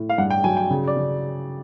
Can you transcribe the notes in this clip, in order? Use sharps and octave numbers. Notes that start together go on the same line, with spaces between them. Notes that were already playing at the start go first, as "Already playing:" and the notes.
Already playing: A2
F5
G2 F#5
G5
F#3 G#5
G5
C#3
D5
C#3